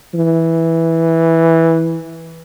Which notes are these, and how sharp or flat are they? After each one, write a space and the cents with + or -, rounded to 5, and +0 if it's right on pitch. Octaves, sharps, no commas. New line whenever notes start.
E3 -5